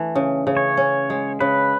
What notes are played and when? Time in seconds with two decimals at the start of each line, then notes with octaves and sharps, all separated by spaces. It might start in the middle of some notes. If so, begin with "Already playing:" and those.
Already playing: E3 A3
0.15 C#3
0.47 C#3
0.57 C#5
0.77 C#4
1.10 G#3
1.40 C#3 B4